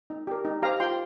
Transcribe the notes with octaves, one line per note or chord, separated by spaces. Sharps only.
D#4
G4 A#4
D#4
G4 C5 F5 A#5
F4 G5 C6